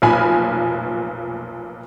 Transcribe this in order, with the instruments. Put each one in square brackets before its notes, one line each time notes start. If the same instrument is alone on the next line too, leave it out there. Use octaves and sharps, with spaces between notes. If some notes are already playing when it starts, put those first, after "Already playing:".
[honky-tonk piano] F1 B1 A#2 G#5 B5 F6